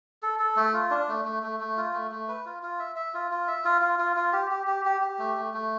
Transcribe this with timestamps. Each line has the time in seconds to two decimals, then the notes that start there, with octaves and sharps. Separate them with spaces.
0.23 A4
0.39 A4
0.56 A3
0.73 F4
0.90 D4
1.09 A3
1.25 A3
1.43 A3
1.60 A3
1.77 F4
1.93 A3
2.11 A3
2.28 B4
2.46 F4
2.63 F4
2.79 E5
2.96 E5
3.14 F4
3.31 F4
3.48 E5
3.65 F4
3.81 F4
3.99 F4
4.16 F4
4.33 G4
4.51 G4
4.67 G4
4.85 G4
5.01 G4
5.19 A3
5.37 A3
5.54 A3